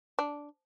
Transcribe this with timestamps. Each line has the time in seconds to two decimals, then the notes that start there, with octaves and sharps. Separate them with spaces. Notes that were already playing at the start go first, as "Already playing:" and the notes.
0.19 D4